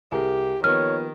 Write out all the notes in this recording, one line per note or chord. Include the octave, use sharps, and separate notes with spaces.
C2 G4 G#4 A#4
D#3 F3 A#3 B3 C#5 F6